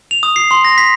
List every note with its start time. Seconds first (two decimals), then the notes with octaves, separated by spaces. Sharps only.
0.11 F7
0.23 D#6
0.36 C7
0.51 C6
0.65 A#6
0.78 B6